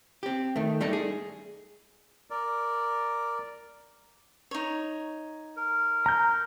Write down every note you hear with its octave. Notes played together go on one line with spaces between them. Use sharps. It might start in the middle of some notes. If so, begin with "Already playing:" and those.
C4 G4
D#3 A3
G3 A3 D4 D#4 A4
G#4
A#4 D5
D#4 C#5
A#4
A#5 G6